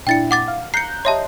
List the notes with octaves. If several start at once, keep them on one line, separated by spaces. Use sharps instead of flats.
A#2 D4 E4 G5 A6 C#7
F#5 D6 A6
F5
A#5 F#6 G6 C7 C#7
G4 C#5 D#5 E5 A5 C6